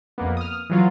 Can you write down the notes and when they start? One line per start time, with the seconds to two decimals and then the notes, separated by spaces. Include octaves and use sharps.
0.18 F2 A#3 B3
0.37 D#6 F6
0.70 E3 F#3 F4